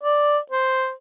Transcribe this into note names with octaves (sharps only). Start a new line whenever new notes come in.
D5
C5